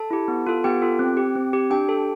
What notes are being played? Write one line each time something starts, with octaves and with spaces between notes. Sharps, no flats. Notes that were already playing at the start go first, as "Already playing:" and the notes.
Already playing: A4 A5
E4 G4
B3
F4 A4
B3 G4 G5
F4 A4
C4
G4
C4
G4
D4 G4 G5
A4